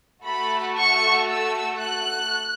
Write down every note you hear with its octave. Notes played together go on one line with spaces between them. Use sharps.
A3 F#4 A4 B5
C#6
E6
F#6